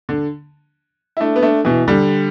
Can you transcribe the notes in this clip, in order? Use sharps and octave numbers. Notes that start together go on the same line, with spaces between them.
D3
E4
A3 D4
B3
A3 D4
B2 E3
D3 G3